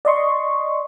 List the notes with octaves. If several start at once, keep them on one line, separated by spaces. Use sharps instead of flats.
D5 D#5 C6 C#6